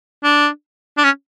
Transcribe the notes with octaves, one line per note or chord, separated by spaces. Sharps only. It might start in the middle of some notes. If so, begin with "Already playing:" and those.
D4
D4
C#4